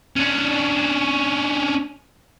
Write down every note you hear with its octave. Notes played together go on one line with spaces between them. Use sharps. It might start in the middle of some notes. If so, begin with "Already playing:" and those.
C#4 D4